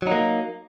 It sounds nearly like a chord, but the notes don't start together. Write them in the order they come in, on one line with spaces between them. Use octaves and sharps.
F#3 D#4 A#3